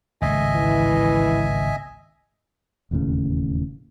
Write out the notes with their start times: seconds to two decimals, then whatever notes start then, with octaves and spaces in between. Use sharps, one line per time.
0.22 G#1 C#2 A2 D#5 E5 G#5
0.56 E3
2.91 E1 D#2 A2 C#3